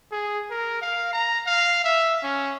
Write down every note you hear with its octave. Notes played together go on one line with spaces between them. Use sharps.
G#4
A#4
F5
A#5
F5
E5
C#4